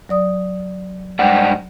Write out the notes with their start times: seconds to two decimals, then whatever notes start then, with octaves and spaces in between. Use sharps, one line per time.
0.09 F#3 D5 D#6
1.19 G#2 G3 F#5 G5